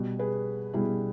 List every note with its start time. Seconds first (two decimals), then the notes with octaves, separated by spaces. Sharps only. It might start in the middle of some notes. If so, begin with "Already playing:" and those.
Already playing: B2 G3
0.19 G#4 B4
0.73 B2 G3 E4 G#4